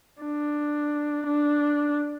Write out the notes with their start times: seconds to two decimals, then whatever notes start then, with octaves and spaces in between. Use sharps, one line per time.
0.22 D4
1.26 D4